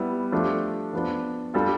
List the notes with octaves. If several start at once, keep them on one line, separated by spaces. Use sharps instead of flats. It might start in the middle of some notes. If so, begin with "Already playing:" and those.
Already playing: G3 B3 E4
F3 A3 D4 G4
F3 B3 D4
G3 D4 F4 A4